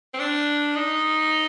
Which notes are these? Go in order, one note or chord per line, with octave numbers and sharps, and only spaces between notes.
C4
D4
D#4